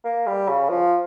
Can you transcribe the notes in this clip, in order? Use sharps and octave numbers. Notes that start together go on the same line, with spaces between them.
A#3
G3
C#3
F3